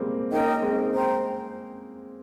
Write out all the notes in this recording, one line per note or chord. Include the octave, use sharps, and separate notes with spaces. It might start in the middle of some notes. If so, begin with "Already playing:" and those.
Already playing: G3 G#3 A#3 C4
A#3 C#4 D#4 A#4 D#5 G5
G#3 C4
C5 G5 A#5